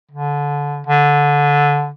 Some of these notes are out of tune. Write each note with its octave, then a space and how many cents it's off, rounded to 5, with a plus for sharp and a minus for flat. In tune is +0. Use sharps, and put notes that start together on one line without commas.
D3 -20
D3 -15